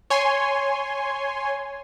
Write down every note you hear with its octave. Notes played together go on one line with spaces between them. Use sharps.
C#5 G#5 C6